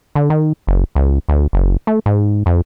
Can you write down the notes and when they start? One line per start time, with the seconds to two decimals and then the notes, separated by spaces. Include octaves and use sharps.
0.15 D3
0.30 D#3
0.67 F#1
0.95 C#2
1.29 D2
1.53 F#1
1.87 A3
2.06 G#2
2.46 F2